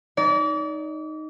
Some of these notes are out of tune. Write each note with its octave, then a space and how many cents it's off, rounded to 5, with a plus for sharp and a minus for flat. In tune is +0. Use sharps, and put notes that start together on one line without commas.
D#4 +0 D5 -35